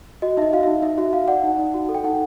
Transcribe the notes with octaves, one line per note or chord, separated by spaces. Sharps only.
F#4 D#5
D#4 D#5 E5
F#4 F5
D#4 E5
D#4 E5
F#4 E5
F#4 F5
D5 F#5
D#4
D#4
F#4
A4
G5
D#4 F#5